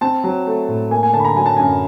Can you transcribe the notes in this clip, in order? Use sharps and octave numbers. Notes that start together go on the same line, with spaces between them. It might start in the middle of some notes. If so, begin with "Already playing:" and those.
C4 A5
F#3
A3
A2
A#3 G#5
G#5
D3 A5
B5
A#5
F#3 G#5
A5
F#2 G#5